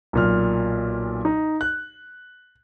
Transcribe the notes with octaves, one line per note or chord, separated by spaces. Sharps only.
B1 A#2 F6
D#4
F#6